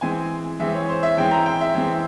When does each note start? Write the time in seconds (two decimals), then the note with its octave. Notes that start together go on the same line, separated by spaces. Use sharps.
0.01 E3 G#3 C4 G#5
0.60 E3 G#3 C4 E5
0.75 C#5
0.89 C5
1.03 E5
1.17 E3 G#3 C4 G5
1.31 A#5
1.46 G5
1.61 E5
1.75 E3 G#3 C4